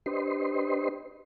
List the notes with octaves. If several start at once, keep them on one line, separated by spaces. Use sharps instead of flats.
D4 G4 B4 C5 D#5 C6